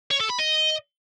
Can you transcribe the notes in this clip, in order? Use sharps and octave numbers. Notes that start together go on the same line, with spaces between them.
C#5
A4
B5
D#5